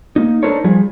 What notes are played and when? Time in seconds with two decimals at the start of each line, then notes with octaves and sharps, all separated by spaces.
0.16 A#3 D#4
0.43 D4 D#4 A4 A#4 C5 C#5
0.64 F3 G3 G#4